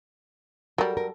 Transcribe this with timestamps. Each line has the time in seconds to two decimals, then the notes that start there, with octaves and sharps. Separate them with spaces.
0.78 F#3 G3 A4 A#4
0.97 A#4